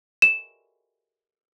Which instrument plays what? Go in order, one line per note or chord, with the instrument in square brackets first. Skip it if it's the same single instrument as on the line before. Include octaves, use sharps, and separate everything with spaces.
[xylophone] E7